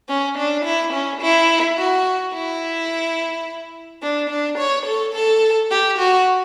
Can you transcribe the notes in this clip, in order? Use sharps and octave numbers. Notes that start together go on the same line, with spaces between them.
C#4
D4
E4
C#4
E4
F#4
E4
D4
D4
C#5
A4
A4
G4
F#4